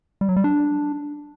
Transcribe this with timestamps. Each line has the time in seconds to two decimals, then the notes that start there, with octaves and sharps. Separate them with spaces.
0.21 G3
0.29 F#3
0.36 G3
0.44 D4